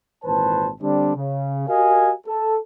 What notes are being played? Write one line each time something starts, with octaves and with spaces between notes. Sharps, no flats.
G#1 A#2 E3 B4 C5 A5
D3 G3 C4 D4
C#3
F#4 G4 A#4 D#5 F5 G#5
A4